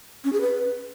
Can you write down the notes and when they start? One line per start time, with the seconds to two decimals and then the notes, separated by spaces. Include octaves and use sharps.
0.24 C#4
0.33 G#4
0.41 B4